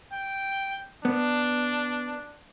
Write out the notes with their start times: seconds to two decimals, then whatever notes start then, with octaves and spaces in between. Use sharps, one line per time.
0.13 G5
1.05 B3 D4